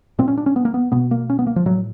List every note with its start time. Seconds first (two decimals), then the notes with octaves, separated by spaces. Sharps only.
0.19 A#2 C4
0.28 C#4
0.38 D4
0.46 C#4
0.56 B3
0.65 A#3
0.74 B3
0.92 B2 B3
1.11 A#3
1.30 C#4
1.39 B3
1.47 A#3
1.56 F3
1.66 A2 F#3